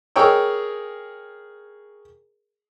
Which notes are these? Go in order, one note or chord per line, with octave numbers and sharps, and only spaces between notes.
G#4 A#4 C#5 G5 E6